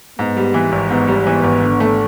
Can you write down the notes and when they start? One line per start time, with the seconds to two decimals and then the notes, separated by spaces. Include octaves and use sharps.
0.18 G#2 B3
0.36 G3
0.54 E3
0.72 G#1
0.90 G#2 B3
1.07 G3
1.26 E3 B3
1.44 G#1
1.62 D3
1.80 A3